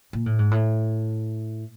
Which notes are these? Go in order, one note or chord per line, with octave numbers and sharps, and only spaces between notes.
A#2
A2
G#2
A2